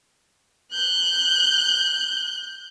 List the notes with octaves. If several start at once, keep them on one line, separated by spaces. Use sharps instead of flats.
F#6 G6